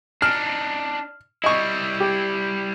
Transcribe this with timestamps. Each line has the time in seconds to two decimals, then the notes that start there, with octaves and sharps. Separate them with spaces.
0.22 D4 D#4 F6
1.44 G3 E4 D#5 C#6
2.00 G4